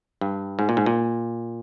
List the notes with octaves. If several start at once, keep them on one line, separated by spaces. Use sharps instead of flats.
G2
G#2
A#2
G#2
A#2